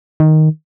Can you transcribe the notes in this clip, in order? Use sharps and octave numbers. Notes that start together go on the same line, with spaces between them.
D#3